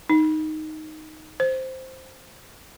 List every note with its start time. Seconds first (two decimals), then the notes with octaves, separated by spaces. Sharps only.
0.10 D#4
1.40 C5